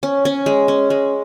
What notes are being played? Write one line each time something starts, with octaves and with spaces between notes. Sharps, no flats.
C#4
C#4
G#3
C#4
G#3